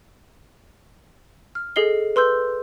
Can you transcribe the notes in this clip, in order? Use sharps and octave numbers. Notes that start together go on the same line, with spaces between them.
F6
G#4 A4 D#5 C7 G7
B4 C6 E6 G6